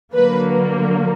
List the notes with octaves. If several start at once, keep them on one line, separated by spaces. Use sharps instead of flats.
D3 F#3 A#3 B4